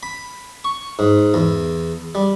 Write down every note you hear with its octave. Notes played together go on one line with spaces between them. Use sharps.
B5
C#6
G#2
E2
G3